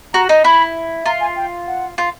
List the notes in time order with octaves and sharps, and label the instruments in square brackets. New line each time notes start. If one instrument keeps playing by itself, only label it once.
[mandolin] F#4 [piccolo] A#5
[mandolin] D#4
[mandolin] E4 [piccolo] B5
[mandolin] F4 [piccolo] A#5
[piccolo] G#5
G5
F#5
[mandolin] F4